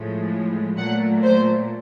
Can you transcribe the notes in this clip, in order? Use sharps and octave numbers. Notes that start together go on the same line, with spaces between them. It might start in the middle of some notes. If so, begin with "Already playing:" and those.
Already playing: A2 F3 G#3
A#2 F#3 A3 F#5
C5